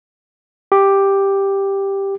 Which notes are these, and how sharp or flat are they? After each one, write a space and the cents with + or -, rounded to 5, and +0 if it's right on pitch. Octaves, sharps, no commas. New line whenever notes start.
G4 +5